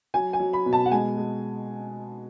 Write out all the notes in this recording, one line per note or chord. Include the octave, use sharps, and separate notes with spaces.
F#3 G#5
G#5
F#3
B5
B2
A5
F#5
G#3 G#5
G#3